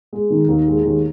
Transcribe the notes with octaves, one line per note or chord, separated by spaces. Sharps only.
G#3
D#3
D#2
G#3
D#2